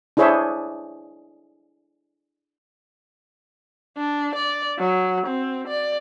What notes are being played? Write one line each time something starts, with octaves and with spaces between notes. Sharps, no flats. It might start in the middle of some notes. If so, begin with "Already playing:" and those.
D4 E4 G#4 C5 C#5 E5
D4
D5
F#3
C4
D5